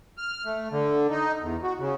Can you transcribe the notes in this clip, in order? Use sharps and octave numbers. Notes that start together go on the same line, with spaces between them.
F6
A3
D3
D#4
E2
F#4
C#3